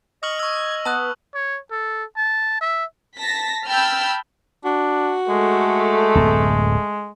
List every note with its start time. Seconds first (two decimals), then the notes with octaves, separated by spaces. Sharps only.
0.23 D#5 C#6 D#6 F6 F#7
0.39 C#6 E6 G#6
0.85 B3 A5 D#6 F#6
1.34 C#5
1.71 A4
2.17 A5
2.61 E5
3.18 A5 A#6 B6
3.66 G5 A5 B5 E6 F6 G6
4.65 D4 F#4
5.29 G#3 A3 A4
6.15 D1 F#2 B3